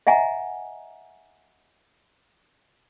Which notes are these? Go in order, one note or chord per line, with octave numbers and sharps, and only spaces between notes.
D#5 E5 F#5 G#5 A#5